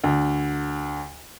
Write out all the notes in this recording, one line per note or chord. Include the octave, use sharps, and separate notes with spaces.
D2